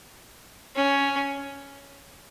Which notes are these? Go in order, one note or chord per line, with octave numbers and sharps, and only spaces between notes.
C#4